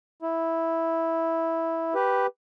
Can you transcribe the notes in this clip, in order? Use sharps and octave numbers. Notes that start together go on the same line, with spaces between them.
E4
G4 B4